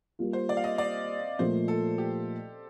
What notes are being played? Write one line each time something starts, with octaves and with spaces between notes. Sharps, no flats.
G3 A#3 F4
C5
D5
F5
D#5
D5
A#2 F3 A3 C5
A4
G4